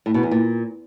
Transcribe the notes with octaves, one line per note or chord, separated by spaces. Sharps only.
A2
B2
E2
A#2